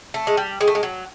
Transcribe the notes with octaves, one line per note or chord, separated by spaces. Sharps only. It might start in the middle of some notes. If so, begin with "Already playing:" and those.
A3
G#3
G3
G#3
A3
G#3
F#3